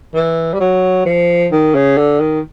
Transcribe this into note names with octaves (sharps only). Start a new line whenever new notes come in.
E3
G3
F#3
F3
D#3
C#3
D3
D#3